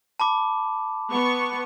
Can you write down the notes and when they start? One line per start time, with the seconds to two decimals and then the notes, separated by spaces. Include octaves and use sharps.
0.20 A5 B5 D6
1.11 B3 C#6